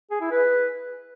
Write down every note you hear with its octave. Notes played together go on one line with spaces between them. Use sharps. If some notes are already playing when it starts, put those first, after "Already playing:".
G#4
E4
B4